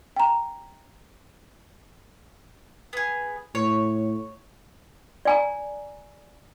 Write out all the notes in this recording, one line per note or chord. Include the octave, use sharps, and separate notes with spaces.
G5 A#5
B3 G#4
A2 C#5
D5 G#5 A#5